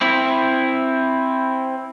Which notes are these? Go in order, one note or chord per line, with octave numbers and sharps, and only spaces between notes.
C4 E4